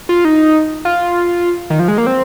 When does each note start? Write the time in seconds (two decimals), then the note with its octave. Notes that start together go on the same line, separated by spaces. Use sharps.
0.09 F4
0.25 D#4
0.85 F4
1.70 D#3
1.79 F3
1.88 G#3
1.98 A#3
2.07 C4